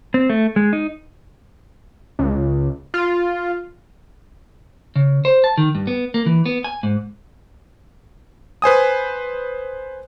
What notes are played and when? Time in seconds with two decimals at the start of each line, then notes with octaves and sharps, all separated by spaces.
0.14 C4
0.30 A3
0.56 G#3
0.73 D#4
2.19 C#2
2.94 F4
4.96 C#3
5.25 C5
5.44 A5
5.58 D#3
5.75 G2
5.87 B3
6.14 A#3
6.26 E3
6.46 B3
6.64 G#5
6.83 G#2
8.62 B4 C5 G#5 D#6